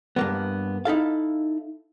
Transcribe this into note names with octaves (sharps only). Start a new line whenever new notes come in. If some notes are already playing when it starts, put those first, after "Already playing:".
G2 A#3 B3
D#4 E4 A4 F5